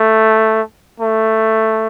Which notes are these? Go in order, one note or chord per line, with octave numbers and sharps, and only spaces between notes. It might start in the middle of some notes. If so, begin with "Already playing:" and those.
Already playing: A3
A3